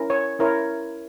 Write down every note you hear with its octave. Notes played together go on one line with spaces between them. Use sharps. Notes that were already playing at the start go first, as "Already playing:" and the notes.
Already playing: C#4 E4 A#4
C#5
C#4 E4 A#4 C#5